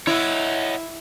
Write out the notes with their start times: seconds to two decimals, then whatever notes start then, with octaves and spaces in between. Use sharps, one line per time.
0.07 E4 C#5 D#5 F#5